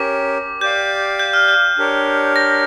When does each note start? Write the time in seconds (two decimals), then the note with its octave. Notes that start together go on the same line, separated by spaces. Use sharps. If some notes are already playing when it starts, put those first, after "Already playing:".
Already playing: C#4 G4 A#4 D6
0.61 G4 D5 F5 G6
1.19 G6
1.33 F6
1.48 G6
1.78 D4 G4 A#4 C#5
2.36 A#6